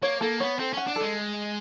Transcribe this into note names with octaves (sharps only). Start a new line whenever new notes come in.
A#3 C#5
A#3 A4
B3 C#5
C4 A4
C#4 F#5
D4
A4
G#3